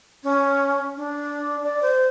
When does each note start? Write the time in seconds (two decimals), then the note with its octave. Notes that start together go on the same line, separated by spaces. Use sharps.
0.23 C#4
0.97 D4
1.64 D5
1.82 C5